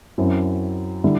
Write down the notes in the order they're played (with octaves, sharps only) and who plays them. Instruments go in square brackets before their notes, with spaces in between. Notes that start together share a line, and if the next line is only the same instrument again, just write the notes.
[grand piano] F#2 F#3 C4 E4
D3 G3 E4